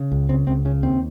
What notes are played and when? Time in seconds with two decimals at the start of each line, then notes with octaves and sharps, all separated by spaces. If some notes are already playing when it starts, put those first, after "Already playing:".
Already playing: C#3
0.12 C#2
0.29 C#3 C4
0.47 C#2 C4
0.65 C#3 C#4
0.83 D#2 C4